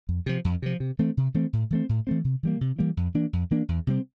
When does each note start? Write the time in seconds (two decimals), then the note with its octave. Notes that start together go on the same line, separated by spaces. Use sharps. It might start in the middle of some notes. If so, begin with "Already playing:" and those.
0.09 F2
0.26 C3 F3
0.45 F2
0.62 C3 F3
0.80 C3
0.99 E3 A3 C4
1.17 C3
1.34 E3 A3 C4
1.53 A2
1.70 E3 A3 C4
1.89 A2
2.07 E3 A3 C4
2.24 C3
2.43 E3 G3 A#3
2.61 C3
2.79 E3 G3 A#3
2.97 F2
3.14 E3 A#3 D4
3.33 F2
3.51 E3 A#3 D4
3.68 E2
3.87 C3 G3 C4